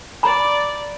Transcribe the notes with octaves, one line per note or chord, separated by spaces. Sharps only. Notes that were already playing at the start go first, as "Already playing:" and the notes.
D5 A#5 B5